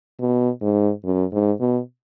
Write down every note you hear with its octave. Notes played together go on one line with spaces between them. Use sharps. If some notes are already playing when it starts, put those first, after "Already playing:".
B2
G#2
F#2
G#2
B2